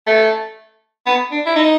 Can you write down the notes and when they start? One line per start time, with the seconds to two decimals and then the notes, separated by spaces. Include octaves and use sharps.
0.07 A3
1.06 B3
1.31 D4
1.46 E4
1.55 D#4